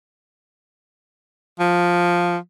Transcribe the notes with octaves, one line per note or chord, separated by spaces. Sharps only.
F3